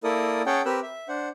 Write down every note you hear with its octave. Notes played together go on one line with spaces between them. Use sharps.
A#3 E4 A4 A#4 D5 D#6
C#4 G#4 C#5 F#5 G5 A5
C4 G4 A#4 B4 E6 F#6
E5
D4 C5 F#5